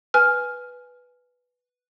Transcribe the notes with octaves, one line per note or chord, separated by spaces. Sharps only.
B4 G#5 F6